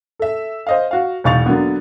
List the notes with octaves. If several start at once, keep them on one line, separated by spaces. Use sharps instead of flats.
A4 E5
C5 D#5 F5
F#4 F5
E1 B1 F5 C#6 A6 F7
D3 F#3 A#3 B3